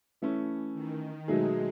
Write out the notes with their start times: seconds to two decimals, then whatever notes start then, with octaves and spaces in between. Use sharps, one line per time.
0.22 E3 A3 C#4 E4
0.74 D#3
1.28 B2 F#3 G#3 A3 D#4 G#4